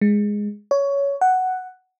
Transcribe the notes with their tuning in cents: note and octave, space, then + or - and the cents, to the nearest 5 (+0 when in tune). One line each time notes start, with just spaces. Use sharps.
G#3 -5
C#5 +15
F#5 +5